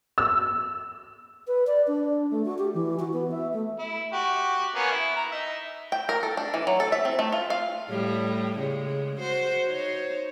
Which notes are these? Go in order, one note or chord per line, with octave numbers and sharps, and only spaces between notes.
E6
B4
D5
D4
A3
F#4
G4
E3
F#4
B3
E5
A3
E4
F#4 G4
A#3 B3 C#4
E4
A#5
D#4 E5
G5
A#4
A4
D4
E3
F#3
A4
E5
C4
A3
F4
F5
A2 G3
C#3 G#3
F#4 C5
D#4 C5 C#5